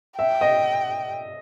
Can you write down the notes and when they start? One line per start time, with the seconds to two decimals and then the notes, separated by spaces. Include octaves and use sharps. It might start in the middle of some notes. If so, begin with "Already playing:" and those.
0.18 E5 G5
0.41 D#5